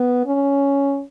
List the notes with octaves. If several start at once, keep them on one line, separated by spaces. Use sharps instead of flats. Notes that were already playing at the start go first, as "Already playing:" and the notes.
Already playing: B3
C#4